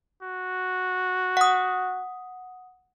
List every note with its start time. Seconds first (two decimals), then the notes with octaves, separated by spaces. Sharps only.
0.22 F#4
1.37 F#5 D#6